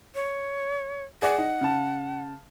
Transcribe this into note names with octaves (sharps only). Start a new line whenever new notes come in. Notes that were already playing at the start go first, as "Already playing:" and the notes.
C#5
G#4 D5 F#5 G#5
D#4
C#3 A5